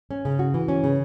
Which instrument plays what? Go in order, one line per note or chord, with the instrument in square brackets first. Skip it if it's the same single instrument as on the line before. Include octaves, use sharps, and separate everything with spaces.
[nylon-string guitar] C#4
C#3
F#4
E3
C#4
C#3